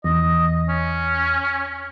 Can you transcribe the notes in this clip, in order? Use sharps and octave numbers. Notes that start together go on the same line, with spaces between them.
E2 D#5
C#4